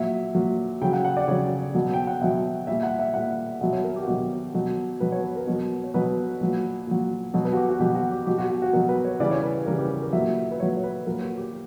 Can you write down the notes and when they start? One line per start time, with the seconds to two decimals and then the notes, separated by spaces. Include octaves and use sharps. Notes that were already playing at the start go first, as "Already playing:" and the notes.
Already playing: A#2 F#3 E5
0.35 A#2 F#3
0.82 C#3 F#3 G5
0.93 F#5
1.05 F#5
1.17 D5
1.28 C#3 F#3 C#5
1.75 B2 F#3
1.94 G5
2.07 F#5
2.21 B2 F#3 E5
2.67 A#2 G3 E5
2.83 F#5
2.99 E5
3.14 A#2 G3 F#5
3.61 B2 F#3 E5
3.73 C#5
3.84 A#4
3.96 G4
4.03 F#4
4.08 B2 F#3 G4
4.54 B2 F#3
5.00 B2 F#3 B4
5.12 C#5
5.24 B4
5.36 A#4
5.47 B2 F#3
5.84 C#5
5.94 B2 F#3 B4
6.41 A#2 F#3
6.87 A#2 F#3
7.34 B2 F#3
7.45 B4
7.53 F#4
7.57 G4
7.69 F#4
7.80 B2 F#3 G4
7.95 F#4
8.11 G4
8.26 B2 F#3 G4
8.38 F#4
8.50 F#4
8.62 F#4
8.73 B2 F#3 A#4
8.89 B4
9.05 C#5
9.20 C#3 E3 G3 D5
9.31 C#5
9.43 B4
9.66 C#3 E3 G3 A#4
9.79 G4
9.90 G4
10.02 A#4
10.13 A#2 F#3 E5
10.51 B4
10.60 A#2 F#3 C#5
10.77 C#5
10.84 B4
11.07 A#2 F#3 A#4
11.22 F#4
11.37 G4